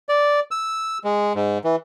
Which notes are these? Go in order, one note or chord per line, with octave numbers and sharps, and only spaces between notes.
D5
E6
G#3
G#2
E3